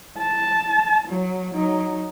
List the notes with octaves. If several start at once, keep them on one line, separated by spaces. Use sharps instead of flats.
A5
F#3
F#3 D#4